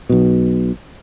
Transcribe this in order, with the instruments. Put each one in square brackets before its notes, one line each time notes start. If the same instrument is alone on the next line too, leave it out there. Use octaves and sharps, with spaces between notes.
[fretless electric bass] B1 B2